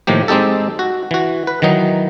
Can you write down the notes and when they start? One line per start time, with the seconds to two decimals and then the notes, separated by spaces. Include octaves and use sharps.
0.07 A2 D#3 F3 A#3 G4
0.28 G#3 C4 D#4 G4 A4
0.79 F#4
1.11 E3 F#4
1.47 B4
1.62 D#3 E3 F#3 D#4